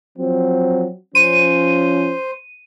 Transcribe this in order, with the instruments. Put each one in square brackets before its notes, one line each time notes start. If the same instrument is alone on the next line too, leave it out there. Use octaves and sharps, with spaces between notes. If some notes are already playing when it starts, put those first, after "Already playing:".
[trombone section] F3 F#3 C4
[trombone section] F3 C#4 [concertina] C5 [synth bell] D#7